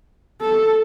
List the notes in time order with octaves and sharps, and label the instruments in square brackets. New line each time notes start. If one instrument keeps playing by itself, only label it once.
[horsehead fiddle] A4